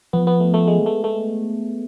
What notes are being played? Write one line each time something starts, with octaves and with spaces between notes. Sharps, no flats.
F3 B3
B3
A3
A3
G#3
A3
A3